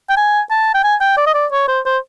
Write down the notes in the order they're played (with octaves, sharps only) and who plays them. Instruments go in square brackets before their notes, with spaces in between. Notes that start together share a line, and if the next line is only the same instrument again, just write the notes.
[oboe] G5
G#5
A5
G5
G#5
G5
D5
D#5
D5
C#5
C5
C5